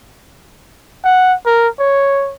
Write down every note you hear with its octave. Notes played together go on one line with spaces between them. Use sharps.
F#5
A#4
C#5